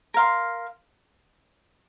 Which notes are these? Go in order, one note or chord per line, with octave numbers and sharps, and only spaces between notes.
A#4 F5 C6